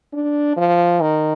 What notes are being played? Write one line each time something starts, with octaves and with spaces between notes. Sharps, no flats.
D4
F3
D#3